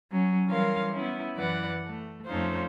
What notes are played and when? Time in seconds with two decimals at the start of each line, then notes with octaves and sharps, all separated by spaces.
0.11 F#3 C#4
0.47 E3 G3 C#4 A#4 F5 C6
0.93 B3 C#4 E4
1.35 F#2 E3 B4 D5 F#5
1.85 A3
2.27 F2 A3 C#4 D#4 F4 C5